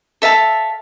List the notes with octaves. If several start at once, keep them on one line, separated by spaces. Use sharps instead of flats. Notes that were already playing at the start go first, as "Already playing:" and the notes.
A4 E5 F5 A5